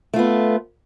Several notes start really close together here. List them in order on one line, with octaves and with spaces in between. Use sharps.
A3 F4 B3